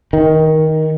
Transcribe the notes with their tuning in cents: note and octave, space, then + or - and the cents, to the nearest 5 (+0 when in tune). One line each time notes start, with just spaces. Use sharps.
D#3 +15